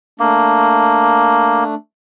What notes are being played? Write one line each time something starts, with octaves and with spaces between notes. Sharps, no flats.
A3 A#3 D4